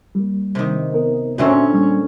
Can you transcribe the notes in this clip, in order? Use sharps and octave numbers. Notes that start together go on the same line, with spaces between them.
G3 A#3
C3 D#3
B3 A#4
A#2 D3 C4 C#4 F#4 E5
G3 A#3 D4